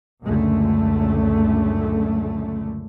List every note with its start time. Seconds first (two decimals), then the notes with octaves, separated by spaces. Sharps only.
0.24 C#2 F#2 A#2 D3 A3